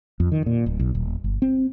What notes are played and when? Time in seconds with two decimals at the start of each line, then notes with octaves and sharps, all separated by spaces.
0.20 F2
0.32 D#3
0.46 A#2
0.66 D1
0.79 B1
0.95 D#1
1.24 G1
1.42 C4